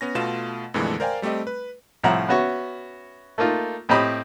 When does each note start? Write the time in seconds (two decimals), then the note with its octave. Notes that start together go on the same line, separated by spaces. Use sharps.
0.01 B3 C#4 A#6
0.15 B2 A3 F4 F5 E7
0.74 F2 A#2 D3 E3 G#3 A3
1.00 A#4 C5 D5 F5 G5 G#5
1.22 G3 A3 C4 G4 D#5
1.47 B4
2.03 C2 A2 F3 E5 F#5 A#5
2.29 B3 C#4 F#4 E5 C#6
3.38 A3 A#3 D#4 F4
3.89 A2 C4 G4 D#5 B5 D#6